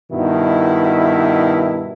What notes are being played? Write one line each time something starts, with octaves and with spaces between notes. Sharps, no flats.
G2 B2 D#3 E4